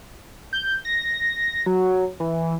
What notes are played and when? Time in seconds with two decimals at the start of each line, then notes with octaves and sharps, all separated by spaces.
0.53 G6
0.85 A#6
1.66 F#3
2.20 E3